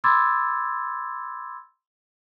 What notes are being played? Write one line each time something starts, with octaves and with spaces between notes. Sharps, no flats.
B5 C6 D6 E6 G#6 A6